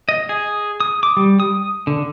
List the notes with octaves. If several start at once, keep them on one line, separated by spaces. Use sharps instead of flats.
D#5
G#4
D#6
D6
G3
D#6
D3